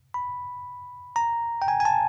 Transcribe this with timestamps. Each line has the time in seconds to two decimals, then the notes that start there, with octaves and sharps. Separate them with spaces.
0.14 B5
1.16 A#5
1.62 G5
1.68 G#5
1.80 G#5
1.85 A5